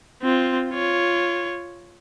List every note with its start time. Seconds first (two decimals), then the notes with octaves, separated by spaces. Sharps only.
0.23 C4 F4
0.70 F4 C#5